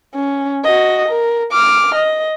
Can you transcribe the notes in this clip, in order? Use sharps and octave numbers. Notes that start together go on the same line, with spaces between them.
C#4
F#4 D#5
A#4
D6 F6
D#5